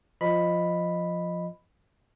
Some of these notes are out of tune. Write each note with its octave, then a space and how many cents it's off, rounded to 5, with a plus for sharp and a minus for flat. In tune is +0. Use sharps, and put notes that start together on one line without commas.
F3 +0 D#5 -5 B5 +0